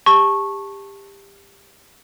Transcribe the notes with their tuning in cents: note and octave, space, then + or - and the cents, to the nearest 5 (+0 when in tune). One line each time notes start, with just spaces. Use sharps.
G4 +20 A5 +0 C#6 -15